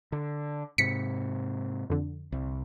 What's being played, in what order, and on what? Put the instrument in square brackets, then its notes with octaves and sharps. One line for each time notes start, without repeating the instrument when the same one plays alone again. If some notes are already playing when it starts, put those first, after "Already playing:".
[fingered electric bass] D3
[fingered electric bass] G#2 C3 [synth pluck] B6 C#7
[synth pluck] F2 D3
[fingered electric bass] C2